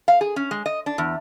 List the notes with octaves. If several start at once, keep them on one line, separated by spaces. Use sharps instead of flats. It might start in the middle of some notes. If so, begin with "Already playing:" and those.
F5
G#4
C#4
G#3
D#5
D4
E2